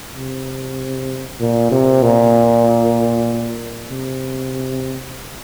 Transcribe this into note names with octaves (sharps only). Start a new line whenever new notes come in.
C3
A#2
C3
A#2
C3